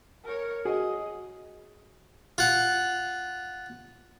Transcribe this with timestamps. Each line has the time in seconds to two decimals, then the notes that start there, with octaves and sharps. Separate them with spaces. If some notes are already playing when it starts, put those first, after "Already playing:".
0.25 A#4 C#5
0.65 F#4 G#4 D#5
2.38 F4 F#5